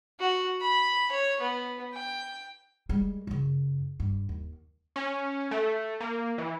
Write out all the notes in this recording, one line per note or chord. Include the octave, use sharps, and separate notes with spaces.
F#4
B5
C#5
B3
G5
G3 G#3
F#2 C#3
G2
D#2
C#4
A3
A#3
E3